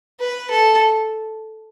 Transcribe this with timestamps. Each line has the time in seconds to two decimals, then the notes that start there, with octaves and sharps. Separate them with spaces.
0.20 B4
0.50 A4